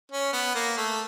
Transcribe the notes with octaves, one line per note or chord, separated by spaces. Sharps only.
C#4
B3
A#3
A3